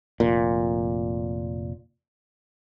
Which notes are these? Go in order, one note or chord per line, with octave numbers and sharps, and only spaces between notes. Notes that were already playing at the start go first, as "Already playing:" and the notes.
F1 A#2